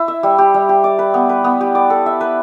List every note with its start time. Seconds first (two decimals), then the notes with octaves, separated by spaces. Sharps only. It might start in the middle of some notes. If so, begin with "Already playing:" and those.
Already playing: E4
0.08 E5
0.23 G3
0.38 G4
0.54 G3
0.69 G4
0.84 D5
0.99 B4
1.14 B3
1.29 B4
1.44 B3
1.61 G4
1.75 D5
1.90 A4
2.06 E5
2.21 B4